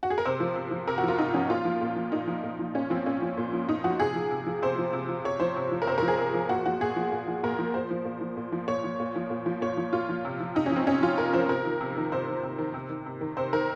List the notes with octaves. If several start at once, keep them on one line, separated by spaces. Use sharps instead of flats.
F#4
G#4
A#4
C3 C5
F3
C3
F3
C3 A#4
F#4
F3 F4
C3 D#4
F3 C#4
A#2 F4
F3
A#2
F3
A#2 D#4
F3
A#2
F3
A#2 C#4
F3 C4
A#2 C#4
F3
A#2
F3
A#2 D#4
F3 F#4
C3 G#4
F3
C3
F3
C3 C5
F3
C3
F3
C3 C#5
F3 C5
C3
F3
A#4
C3 C5
F3 A#4
G#4
C3
F3
A#2 F#4
F3 F#4
A#2 G#4
F3
A#2
F3
A#2 A#4
F3
A#2 C5
F3
A#2
F3
A#2
F3
A#2 C#5
F3
A#2
F3
A#2
F3
A#2 C#5
F3
A#2 F4
F3
C3
F3
C3 D#4
F3 C#4
C4
C3 C#4
F3 F4
C3 A#4
F3 C5
C3 A#4
D#3
C3
D#3
C3 C5
D#3
C3
D#3
C3
D#3
C3
D#3
C3 C5
D#3 A#4